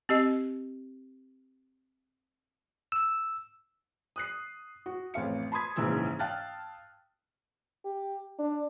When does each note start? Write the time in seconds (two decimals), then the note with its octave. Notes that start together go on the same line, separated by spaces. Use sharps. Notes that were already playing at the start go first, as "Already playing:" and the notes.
0.09 C4 G4 D#5
2.92 E6
4.16 D#6 F#6 C7
4.86 F#4
5.14 A1 F2 F5 C#7
5.52 A5 B5 C6 D#6 G#6 B6
5.76 A#1 G#2 C#3 E3 E6 G#6
6.19 F5 G5 A5 F6 F#6 A6
7.85 G4
8.39 D4